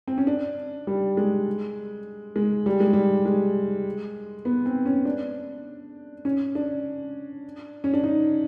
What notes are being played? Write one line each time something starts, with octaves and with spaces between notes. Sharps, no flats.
C4
C#4
D4
G3
G#3
G#3
G3
G#3
G3
G#3
B3
C4
C#4
D4
C#4
D4
C#4
D4
D#4